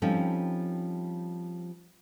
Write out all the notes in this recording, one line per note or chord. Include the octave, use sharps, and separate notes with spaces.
F3 G3 C4 C#4 D#4 A4